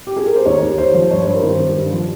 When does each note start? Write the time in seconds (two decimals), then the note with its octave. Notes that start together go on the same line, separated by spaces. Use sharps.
0.07 G4
0.16 G#4
0.26 A#4
0.36 C5
0.45 D#2 C#5
0.62 D#2
0.78 D#2 C5
0.94 F3
1.11 G2 C#5
1.22 G2 C5
1.34 A#4
1.43 D#3 C5
1.60 D#3
1.76 G2
1.93 F3